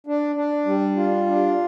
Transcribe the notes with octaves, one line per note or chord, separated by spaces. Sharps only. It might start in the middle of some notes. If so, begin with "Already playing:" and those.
D4
D4
G3
F4
D4